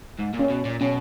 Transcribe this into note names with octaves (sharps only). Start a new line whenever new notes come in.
G#2
A#2
C#4
B2
A#2
B2 C#4